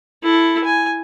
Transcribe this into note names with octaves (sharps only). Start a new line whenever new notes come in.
E4 A4
G#5